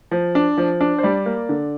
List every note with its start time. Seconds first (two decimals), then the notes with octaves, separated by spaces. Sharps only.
0.11 F3
0.35 D4
0.58 F3
0.81 D4
0.98 C5
1.03 G3 D5
1.26 A#3
1.49 D3